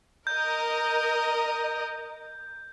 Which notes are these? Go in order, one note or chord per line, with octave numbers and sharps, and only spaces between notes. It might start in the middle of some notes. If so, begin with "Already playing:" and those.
A#4 D#5 G6